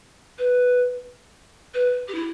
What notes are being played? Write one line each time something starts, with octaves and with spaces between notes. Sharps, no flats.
B4
B4
G4
E4